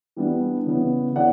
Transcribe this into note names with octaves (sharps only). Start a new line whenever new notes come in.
E3 G3 B3 D4
C#3 E3 B3
C#3 E3 B3 D5 F#5